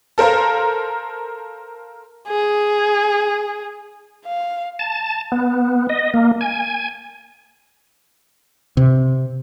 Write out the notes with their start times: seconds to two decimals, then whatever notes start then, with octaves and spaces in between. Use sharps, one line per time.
0.18 A4 A#4 C5 F5 A#5
2.28 G#4
4.25 F5
4.79 A5
5.32 B3
5.89 D#5
6.14 A#3
6.41 G#5
8.77 C3